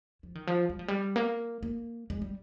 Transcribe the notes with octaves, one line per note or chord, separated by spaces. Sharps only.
F3
D#3
F3
G3
F3
G3
A#3
A#3
G#3
G3